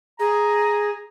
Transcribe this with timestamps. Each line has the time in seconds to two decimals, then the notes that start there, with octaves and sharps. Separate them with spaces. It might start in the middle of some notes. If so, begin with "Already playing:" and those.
0.20 G#4 A#5